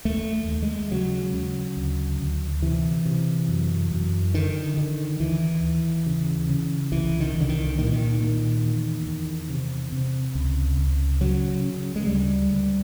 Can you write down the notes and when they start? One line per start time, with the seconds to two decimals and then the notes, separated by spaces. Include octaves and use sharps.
0.05 D#2 A3
0.48 D#2
0.63 G#3
0.91 C#3 F#3
1.33 C#3
1.77 D2
2.20 D2
2.62 C3 E3
3.06 C3
3.48 F#2
3.91 F#2
4.34 D3 D#3
4.77 D3 D#3
5.20 D#2 E3
5.63 D#2
6.06 C#3
6.49 C#3
6.92 C2 E3
7.20 D#3
7.35 C2
7.41 D3
7.49 D#3
7.78 A#2 D#3
7.85 E3
7.93 D#3
8.21 A#2
8.64 E2
9.07 E2
9.49 C3
9.92 C3
10.35 C#2
10.78 C#2
11.21 C#3 F#3
11.64 C#3
11.96 G#3
12.07 D2 G3
12.50 D2